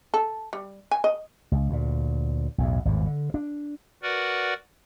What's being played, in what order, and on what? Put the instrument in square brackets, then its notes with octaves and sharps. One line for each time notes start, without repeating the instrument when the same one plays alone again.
[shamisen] A4
G3
G#5
D#5
[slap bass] C#2
D2 A#2
B1 E2 A2
G#1 E2 A2
D3
D4
[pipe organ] F#4 A#4 B4 D5 F#5